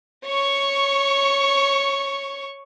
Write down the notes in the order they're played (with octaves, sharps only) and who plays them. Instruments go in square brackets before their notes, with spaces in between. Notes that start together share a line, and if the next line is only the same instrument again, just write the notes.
[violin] C#5 C#6